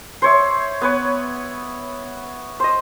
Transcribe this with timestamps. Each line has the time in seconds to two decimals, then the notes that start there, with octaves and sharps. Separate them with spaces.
0.22 C5 C#5 E5
0.81 B3 B4 C#5
2.60 C5 D#5